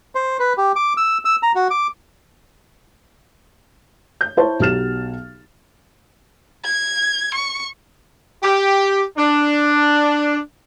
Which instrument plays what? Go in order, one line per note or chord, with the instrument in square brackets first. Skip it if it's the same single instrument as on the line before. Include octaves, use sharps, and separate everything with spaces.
[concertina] C5
B4
G4
D6
E6
E6
A#5
F#4
D6
[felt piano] G6
E4 C5 C#5 A5
B1 F#3 G4 F6 A6 E7
[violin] G#6
C#6
[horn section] G4
D4